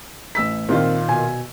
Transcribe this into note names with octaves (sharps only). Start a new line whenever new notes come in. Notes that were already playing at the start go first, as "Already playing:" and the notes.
A1 E6 B6
A#2 D#3 C4 F4
B2 G#5